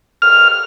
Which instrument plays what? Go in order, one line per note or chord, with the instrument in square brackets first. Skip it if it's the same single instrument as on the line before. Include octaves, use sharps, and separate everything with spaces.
[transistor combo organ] F6